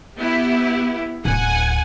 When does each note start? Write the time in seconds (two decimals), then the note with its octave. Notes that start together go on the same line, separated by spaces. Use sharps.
0.17 B3 E4 G4
1.25 D1 F#5 G#5